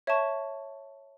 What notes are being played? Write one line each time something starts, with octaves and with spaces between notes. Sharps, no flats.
C#5 E5 A5 C#6